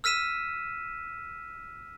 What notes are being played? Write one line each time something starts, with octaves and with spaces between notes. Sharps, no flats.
E6 F6 B6 D#7 E7